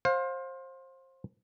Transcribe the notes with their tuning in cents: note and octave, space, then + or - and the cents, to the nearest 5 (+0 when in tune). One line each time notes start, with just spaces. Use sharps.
C5 +25 F5 +25